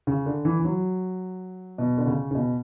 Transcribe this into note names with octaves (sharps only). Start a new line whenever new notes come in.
C#3
D3
E3
E3
F#3
B2
D3
C#3
C#3
B2